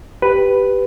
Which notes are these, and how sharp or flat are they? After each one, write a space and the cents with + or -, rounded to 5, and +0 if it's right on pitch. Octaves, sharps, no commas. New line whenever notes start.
G4 +0 B4 +0